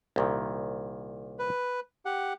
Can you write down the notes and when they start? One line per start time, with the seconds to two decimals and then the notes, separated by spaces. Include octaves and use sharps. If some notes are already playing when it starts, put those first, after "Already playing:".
0.16 C2 A#2 D#3
1.39 B4
2.05 G4 F#5